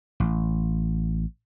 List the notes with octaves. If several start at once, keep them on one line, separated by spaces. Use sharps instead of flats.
A1